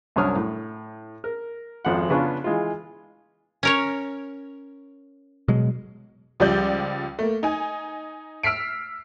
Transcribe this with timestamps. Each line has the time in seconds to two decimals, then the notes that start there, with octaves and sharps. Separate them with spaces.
0.16 C2 F#2 D4 C#5 D#6 F6
0.36 A2
1.24 A#4
1.85 G#1 F2 F#5
2.10 C#3 B3 C#4 D4 F4
2.44 E3 G#3 F4
3.63 C#4 A#4 C#5
5.48 B2 F#3 G#3
6.40 C#2 F3 G3 D5 G6
7.19 A3 A#3
7.43 D#4 G#5
8.43 E6 F6 B6 C7 D7